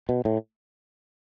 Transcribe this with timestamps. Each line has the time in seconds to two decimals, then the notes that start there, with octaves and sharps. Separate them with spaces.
0.09 B2
0.25 A2